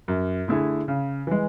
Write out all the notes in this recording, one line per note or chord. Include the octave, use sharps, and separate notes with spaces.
F#2
D3 A3 E4 G#4
C#3
E3 G#3